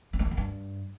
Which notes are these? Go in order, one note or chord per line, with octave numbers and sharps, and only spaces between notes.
B3
A3
A#3
F2
G2